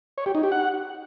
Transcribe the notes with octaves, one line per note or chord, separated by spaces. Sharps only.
C#5
G4
D#4
G4
F#5